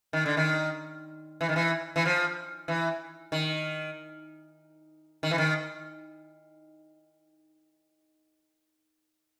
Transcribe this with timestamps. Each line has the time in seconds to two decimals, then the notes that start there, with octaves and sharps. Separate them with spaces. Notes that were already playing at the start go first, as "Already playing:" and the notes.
0.13 D#3
0.26 D3
0.37 D#3
1.41 E3
1.49 D#3
1.56 E3
1.96 E3
2.06 F3
2.68 E3
3.32 D#3
5.23 D#3
5.31 E3
5.38 D#3